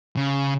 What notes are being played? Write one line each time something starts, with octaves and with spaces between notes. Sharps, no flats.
C#3